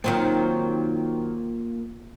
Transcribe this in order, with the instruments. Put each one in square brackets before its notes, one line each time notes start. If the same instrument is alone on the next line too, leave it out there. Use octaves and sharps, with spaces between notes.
[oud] D#3 F#3 C4 [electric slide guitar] A#3 F4 A#4